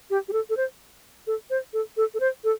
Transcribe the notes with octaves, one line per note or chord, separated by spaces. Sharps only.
G4
G4
A4
A4
C5
A4
C5
A4
A4
A4
C5
A4